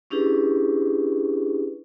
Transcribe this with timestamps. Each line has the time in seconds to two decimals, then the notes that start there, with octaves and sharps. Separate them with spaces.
0.10 C#4 D4 E4 G4 G#4 B4